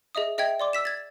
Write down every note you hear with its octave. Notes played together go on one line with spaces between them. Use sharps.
G#4 D#5 E5 D#6
G#4 D#5 E5 G5 G#6
D5 C6 D6
E6 B6 E7
G#6 A6